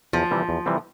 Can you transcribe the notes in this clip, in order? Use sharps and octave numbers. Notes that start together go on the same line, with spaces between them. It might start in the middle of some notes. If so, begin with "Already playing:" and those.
E2 F3
C3 E3 G3 C4
E2
C3 E3 G3 C4